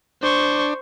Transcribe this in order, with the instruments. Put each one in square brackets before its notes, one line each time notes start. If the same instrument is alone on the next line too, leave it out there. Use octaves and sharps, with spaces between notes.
[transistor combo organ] D4 [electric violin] C5 C#6